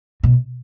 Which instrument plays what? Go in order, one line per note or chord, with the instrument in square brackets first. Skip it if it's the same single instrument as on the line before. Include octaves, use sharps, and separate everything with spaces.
[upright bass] B2